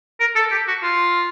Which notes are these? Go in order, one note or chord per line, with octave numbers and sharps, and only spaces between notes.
A#4
A4
G4
F#4
F4